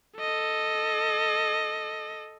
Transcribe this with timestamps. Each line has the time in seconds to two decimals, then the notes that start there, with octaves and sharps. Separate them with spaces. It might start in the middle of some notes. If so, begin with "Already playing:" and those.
0.18 A4 D#5